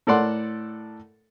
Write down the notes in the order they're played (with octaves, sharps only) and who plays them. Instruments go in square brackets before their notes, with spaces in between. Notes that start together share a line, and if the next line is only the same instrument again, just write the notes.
[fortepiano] A2 A4 A#4 D5 F#5 C6